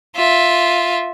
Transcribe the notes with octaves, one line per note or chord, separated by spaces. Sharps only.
F4 E5